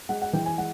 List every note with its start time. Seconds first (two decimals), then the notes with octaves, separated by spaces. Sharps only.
0.09 G#3 F#5
0.22 F#5
0.33 E3 G5
0.46 G#5
0.58 G#3 F#5